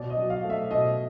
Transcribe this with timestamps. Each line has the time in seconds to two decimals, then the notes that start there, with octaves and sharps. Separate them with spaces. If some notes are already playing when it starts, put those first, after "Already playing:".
Already playing: B2 D5
0.10 D#5
0.17 F#3
0.30 F5
0.44 A3
0.50 E5
0.71 B2 D#5